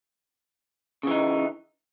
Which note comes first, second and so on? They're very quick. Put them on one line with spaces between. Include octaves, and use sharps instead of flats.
C#3 E3 D#4